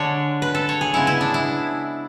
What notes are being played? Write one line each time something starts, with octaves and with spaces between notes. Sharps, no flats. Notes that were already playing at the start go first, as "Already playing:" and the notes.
Already playing: D3 G#3 D4 C#5
B4
A4
C#5
G#4
C#3 G#3 B3 E4
E4
D4
E4